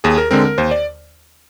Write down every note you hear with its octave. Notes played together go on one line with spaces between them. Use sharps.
D#2 G#4
A#4
D3 G#3 C4 A#4
A#4
D#2 C5
D5